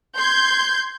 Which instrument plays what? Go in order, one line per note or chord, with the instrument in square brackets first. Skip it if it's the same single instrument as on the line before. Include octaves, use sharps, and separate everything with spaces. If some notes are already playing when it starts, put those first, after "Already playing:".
[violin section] C6 G6 G#6